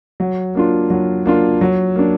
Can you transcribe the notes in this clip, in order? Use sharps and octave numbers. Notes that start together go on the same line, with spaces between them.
F#3
A#3 D4 F4
F#3
A#3 D4 F4
F#3
A#3 D4